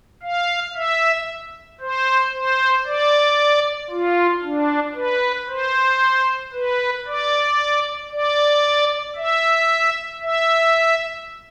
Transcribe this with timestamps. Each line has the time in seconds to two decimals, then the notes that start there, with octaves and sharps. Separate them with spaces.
0.23 F5
0.75 E5
1.80 C5
2.33 C5
2.86 D5
3.90 F4
4.43 D4
4.95 B4
5.48 C5
6.53 B4
7.06 D5
8.11 D5
9.16 E5
10.22 E5